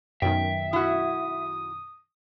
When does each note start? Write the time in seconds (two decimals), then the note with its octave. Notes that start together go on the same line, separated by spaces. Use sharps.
0.22 F#2 B2 D#3 E5 G5
0.73 E4 F#4 D#6